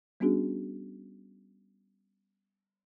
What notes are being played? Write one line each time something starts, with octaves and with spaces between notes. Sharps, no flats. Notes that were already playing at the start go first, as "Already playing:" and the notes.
G3 B3 C#4 D4 F#4 G#4